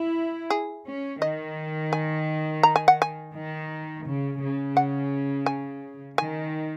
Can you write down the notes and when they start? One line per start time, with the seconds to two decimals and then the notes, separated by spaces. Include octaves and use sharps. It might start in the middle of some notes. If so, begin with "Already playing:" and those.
Already playing: E4
0.50 G#4
0.86 C#4
1.21 D#3 D#5
1.93 G#5
2.63 A#5
2.76 G#5
2.88 F#5
3.02 G#5
3.34 D#3
4.05 C#3
4.41 C#3
4.77 F#5
5.46 G#5
6.18 D#3 G#5